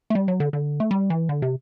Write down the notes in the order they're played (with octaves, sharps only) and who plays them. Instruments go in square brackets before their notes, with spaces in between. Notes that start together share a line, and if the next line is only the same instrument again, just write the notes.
[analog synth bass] A3
G3
F#3
D3
D3
A3
G3
E3
D3
C3